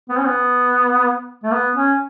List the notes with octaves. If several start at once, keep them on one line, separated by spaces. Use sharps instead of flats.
B3
C#4
B3
A3
B3
C#4